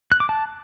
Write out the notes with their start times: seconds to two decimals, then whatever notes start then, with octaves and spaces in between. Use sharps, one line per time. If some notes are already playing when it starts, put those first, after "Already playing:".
0.12 F#6
0.20 D6
0.29 A5